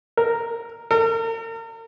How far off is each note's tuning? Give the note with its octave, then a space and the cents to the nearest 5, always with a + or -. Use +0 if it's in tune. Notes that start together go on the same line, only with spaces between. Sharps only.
A#4 -5
A#4 -40